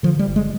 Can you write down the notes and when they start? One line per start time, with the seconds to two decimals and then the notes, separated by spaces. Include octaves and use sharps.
0.03 D3 F3
0.19 G3
0.27 G1
0.36 G#3